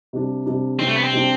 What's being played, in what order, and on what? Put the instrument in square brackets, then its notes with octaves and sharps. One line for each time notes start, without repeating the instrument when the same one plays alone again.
[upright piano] C3 G3 D4
C3 G3 D4
[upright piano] C3 G3 D4 [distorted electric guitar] C4
[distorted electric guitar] A3
B3
C4
[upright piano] C3 G3 D4